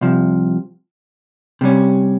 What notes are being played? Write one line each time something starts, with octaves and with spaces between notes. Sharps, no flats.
C2 C3 F3
C3 G3 C#4